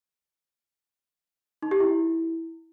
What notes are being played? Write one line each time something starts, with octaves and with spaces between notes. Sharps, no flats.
D#4
G4
E4